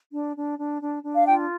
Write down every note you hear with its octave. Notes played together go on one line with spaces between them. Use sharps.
D4
D4
D4
D4
D4
F5
F4 G5